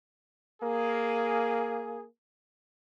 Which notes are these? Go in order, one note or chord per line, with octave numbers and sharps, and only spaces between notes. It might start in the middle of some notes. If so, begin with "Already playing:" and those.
A#3 G#4